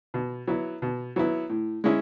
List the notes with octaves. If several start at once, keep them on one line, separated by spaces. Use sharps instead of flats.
B2
F#3 B3 E4
B2
F#3 B3 E4
A2
G#3 C#4 E4